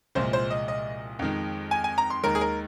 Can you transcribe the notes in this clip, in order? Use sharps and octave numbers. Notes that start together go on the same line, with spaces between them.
C2 A#2 F3 G#3 C5
C5
D#5
D#5
F2 D#3 G#3
G#5
G#5
A#5
C6
D#2 D#3 G#3 A#4
G#4
A#4